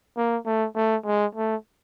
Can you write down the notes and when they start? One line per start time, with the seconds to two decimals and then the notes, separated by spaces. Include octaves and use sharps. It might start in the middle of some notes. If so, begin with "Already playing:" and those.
0.17 A#3
0.46 A3
0.76 A3
1.05 G#3
1.35 A3